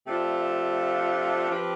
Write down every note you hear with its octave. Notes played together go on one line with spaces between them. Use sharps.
C3 F3 A3 D4 F4
F3 C4 G4 B4